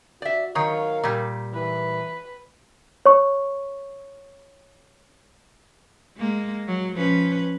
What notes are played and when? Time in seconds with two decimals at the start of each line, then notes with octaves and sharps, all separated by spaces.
0.22 F#4 D5 E5
0.55 D#3 F#3 A#4 C#5 F5
1.04 A#2 G3
1.54 E3 B4
3.06 C#5 C#6
6.17 G#3 A#3
6.67 F#3
6.97 F3 C#4 B4